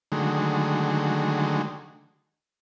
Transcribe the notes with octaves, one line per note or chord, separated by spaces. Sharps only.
D3 D#3 F#3 G#3 A3